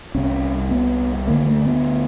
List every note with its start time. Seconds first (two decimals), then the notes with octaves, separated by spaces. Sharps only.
0.15 C2 C3 C#4
0.71 B3
1.27 D2 D3 A#3
1.46 A3
1.65 B3